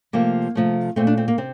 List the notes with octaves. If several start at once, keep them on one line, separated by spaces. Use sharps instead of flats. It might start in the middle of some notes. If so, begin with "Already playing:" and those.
C3 F3 A3 A#3
C3 F3 A3
A#2 A3 C4
D4
C4
A#3
C3 C4